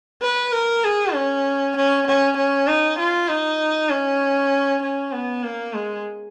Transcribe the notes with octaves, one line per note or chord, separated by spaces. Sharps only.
B4
A#4
G#4
C#4
C#4
C#4
C#4
D#4
F4
D#4
C#4
C#4
B3
A#3
G#3